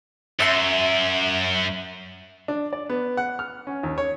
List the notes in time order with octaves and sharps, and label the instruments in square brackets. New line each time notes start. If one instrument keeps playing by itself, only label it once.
[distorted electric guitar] F#2 [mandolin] E5 C6
[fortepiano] D4
D5
B3
F#5
F6
C#4
D#2
C#5